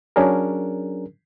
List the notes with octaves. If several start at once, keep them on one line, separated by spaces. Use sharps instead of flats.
F#3 C#4 D4 G#4 A#4